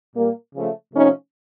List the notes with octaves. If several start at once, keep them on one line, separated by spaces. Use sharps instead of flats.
A#2 G3 A#3
C#3 F3 A3
C3 F3 A3 C#4 D#4